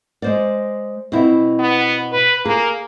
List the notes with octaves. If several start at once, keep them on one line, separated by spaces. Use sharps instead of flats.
G#3 C5 D5
B2 C4 E4
B3
B4
A#3 G#4